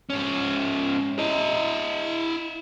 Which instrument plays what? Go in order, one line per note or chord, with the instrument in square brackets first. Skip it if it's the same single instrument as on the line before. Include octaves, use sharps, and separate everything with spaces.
[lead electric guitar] G#2 C#4
E4 D#5